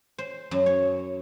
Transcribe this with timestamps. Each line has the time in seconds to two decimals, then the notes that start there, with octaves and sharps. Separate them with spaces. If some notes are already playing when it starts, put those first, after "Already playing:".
0.18 C5
0.51 F#2
0.66 C#5